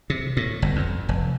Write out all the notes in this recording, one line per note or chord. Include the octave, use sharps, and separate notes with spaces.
C3
A2
G1
F2
F1